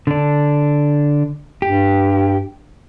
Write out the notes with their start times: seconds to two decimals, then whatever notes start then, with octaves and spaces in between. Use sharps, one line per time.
0.07 D3 D4
1.62 G2 G4